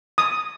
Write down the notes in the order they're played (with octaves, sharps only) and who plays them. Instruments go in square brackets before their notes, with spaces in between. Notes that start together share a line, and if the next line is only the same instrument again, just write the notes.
[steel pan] D#6